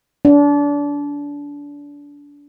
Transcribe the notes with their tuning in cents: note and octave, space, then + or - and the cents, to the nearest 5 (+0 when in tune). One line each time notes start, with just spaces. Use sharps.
D4 -30